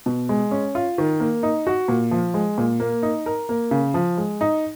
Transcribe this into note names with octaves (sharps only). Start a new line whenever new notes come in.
B2
G#3
C#4
F4
D#3
A#3
D#4
F#4
A#2
F3
G#3
A#2
A#3
D#4
A#4
A#3
C#3
F3
G#3
D#4